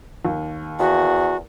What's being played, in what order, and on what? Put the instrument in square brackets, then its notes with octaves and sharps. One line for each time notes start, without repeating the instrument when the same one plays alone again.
[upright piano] D#2
[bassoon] E2 [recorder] F#4